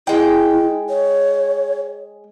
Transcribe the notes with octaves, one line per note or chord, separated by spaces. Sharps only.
G#3 E4 G5
C#5